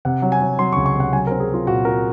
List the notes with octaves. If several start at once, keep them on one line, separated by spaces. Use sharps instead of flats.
C3 F#5
F#3
G#5
F#3
F#3 C6
C#6
C#2
C#6
C3 F#5
F#3 G#5
A#4
C4
G#4
F#3 F4
A#2 F#4
F4 A#4